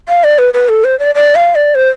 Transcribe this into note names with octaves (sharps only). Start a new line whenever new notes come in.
F5
D5
B4
B4
A4
C5
D5
D5
F5
D5
C5